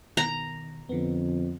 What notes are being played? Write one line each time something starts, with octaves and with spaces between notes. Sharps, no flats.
B2 D#3 A#5
F2 D3 B3